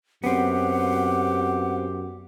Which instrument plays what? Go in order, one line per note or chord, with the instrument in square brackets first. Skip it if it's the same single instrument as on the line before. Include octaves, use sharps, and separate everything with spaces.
[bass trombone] F#2 [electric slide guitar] B3 C4 [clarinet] G4 [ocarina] F#5